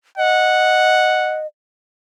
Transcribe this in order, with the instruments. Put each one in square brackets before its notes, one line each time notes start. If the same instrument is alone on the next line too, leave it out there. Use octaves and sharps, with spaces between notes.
[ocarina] D#5 [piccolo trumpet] F#5